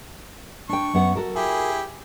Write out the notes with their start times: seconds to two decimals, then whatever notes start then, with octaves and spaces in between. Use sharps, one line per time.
0.69 D4 G5 C#6
0.94 F#2 B3 F#5
1.15 F#4 A4 A#4
1.36 E4 G4 G#4